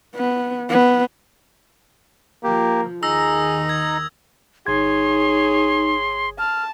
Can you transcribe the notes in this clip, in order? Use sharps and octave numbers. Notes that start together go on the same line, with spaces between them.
B3
B3
F3 A#3 G4
D#2 D#3 D#4 G#4 A#5 D#6 E6 A#6
G#6
G1 D#4 G#4 C#5 C6 G#6
A5 F6